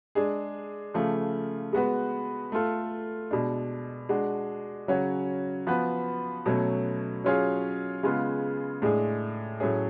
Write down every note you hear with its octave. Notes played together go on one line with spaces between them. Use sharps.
G#3 D4 G#4
C#3 F3 A3
G#3 B3 F#4 B4
A3 F4 A4
B2 G#3 D4
G#3 D4 F#4
C#3 F#3 C#4 F#4
F3 B3 F#4 B4
B2 F#3 A3 C#4
F#3 C#4 F4 G#4
C#3 G#3 B3 F4
A2 G#3 D4 G#4
A2 F#3 A3 C#4 G#4